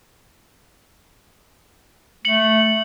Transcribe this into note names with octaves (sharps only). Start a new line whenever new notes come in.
A3 C#7 F#7